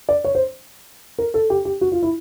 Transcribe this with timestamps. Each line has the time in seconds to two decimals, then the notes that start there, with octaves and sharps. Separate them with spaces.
0.09 D5
0.24 C#5
0.35 C5
1.18 A#4
1.34 A4
1.50 G4
1.65 G4
1.81 F#4
1.92 F4
2.02 E4